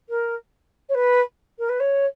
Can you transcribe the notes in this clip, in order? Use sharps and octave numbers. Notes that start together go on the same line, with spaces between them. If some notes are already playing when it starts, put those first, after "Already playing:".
A#4
C#5
B4
A#4
B4
C#5